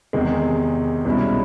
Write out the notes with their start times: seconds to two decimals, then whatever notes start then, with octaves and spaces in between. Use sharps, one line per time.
0.13 E2 C3 D#3 G#3
1.05 C2 B2 G#3 C#4 E4